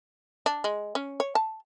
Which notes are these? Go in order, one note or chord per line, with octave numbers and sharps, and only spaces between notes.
D4
G#3
C#4
C#5
A5